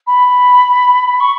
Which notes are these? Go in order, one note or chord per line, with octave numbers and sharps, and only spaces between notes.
B5
C#6